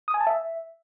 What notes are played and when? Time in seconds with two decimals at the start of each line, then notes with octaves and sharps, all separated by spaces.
0.08 D#6
0.14 G#5
0.20 A5
0.27 E5